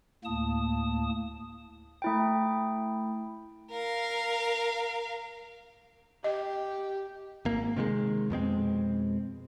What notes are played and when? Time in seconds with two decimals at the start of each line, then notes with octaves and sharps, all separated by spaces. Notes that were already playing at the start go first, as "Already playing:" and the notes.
0.24 D2 A2 A#3 A5 D#6
2.02 A3 E4 G5
3.71 A#4 F5
6.24 G4 D#5
7.45 G#1 A#3
7.76 C3 D#3 G3 G#3
8.30 F2 B2 G#3 C4